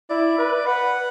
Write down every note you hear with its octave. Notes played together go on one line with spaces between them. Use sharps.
E4 D5
B4
B4 F#5